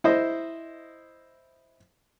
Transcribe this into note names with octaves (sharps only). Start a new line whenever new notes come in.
E4 C5 D#5